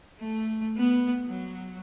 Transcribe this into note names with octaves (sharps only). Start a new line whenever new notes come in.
A3
B3
F#3